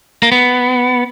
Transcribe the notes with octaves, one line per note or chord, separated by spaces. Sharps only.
A#3
B3